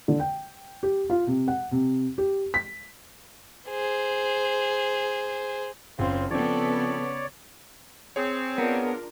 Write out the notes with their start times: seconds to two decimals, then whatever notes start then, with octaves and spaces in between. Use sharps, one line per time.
0.08 D3
0.20 G5
0.83 G4
1.10 F4
1.27 C3
1.48 F#5
1.71 C3
2.18 G4
2.54 B6
3.69 G#4 C5
5.99 F#1 C4 C#4 F4
6.31 C#3 F3 B3 C4 A4 C#5 D5
8.16 C4 G#4 C#5
8.58 B3 D4 F4 A#4